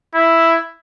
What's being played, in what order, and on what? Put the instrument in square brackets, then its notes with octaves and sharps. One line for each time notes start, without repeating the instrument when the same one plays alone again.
[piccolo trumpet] E4